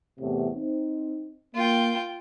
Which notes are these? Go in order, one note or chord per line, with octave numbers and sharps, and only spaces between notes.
E2 A2 C3
C4 D#4
A#3 F4 G5